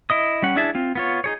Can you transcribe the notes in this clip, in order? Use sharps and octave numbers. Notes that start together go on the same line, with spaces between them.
E4 D#5 D#6
G3 C#4 F#5
D4 E4 G#4 E5 A5
C4 F4
B3 F4 C#5
D#4 G#4 C#5